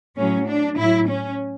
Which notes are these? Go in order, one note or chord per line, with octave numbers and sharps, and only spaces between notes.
A2 F#3 C#4
D4
A2 F#3 E4
C#4